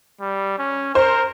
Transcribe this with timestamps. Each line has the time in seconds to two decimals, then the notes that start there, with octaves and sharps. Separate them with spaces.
0.21 G3
0.59 C#4
0.95 A#4 C5